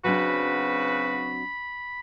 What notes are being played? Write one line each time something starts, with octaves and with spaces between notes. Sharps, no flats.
C#3 F#3 C4 D4 F#4 B4 B5